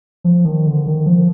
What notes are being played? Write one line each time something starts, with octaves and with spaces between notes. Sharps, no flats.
F3
D#3
D3
D#3
F3